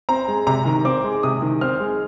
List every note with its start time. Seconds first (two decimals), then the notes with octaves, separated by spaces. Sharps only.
0.09 C4 A#5
0.28 G#3
0.47 C3 A#5
0.65 D#3
0.85 C4 D6
1.04 G#3
1.23 C3 D#6
1.42 D#3
1.61 C4 F6
1.80 G#3